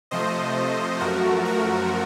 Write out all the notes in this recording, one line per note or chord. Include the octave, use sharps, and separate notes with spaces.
C3 F3 A3 C5 D#5
F#2 F3 A3 F#4 A#4
F#4 A#4